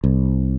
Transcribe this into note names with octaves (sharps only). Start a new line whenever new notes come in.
C2